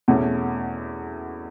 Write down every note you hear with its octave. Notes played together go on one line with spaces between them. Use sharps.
E2 B2 A3 C#4